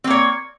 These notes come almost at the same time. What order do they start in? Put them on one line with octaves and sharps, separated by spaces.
C4 A#3 C#5